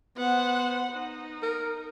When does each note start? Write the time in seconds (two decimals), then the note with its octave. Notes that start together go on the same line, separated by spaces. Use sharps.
0.18 B3 C5 F#5
0.93 D#4
1.43 A#4